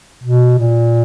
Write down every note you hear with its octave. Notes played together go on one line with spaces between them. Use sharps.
B2
A#2